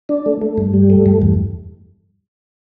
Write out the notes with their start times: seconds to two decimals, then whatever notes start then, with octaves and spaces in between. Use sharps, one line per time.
0.09 D4
0.26 A3
0.41 A3
0.58 G2
0.74 G3
0.90 A3
1.06 G2
1.22 E2